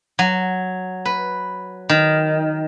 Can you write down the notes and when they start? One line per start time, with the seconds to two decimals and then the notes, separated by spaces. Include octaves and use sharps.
0.19 F#3
1.05 B4
1.89 D#3